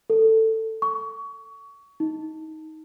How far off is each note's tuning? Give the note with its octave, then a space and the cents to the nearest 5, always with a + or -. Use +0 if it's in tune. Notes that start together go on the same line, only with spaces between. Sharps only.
A4 +15
C#6 +25
D#4 +20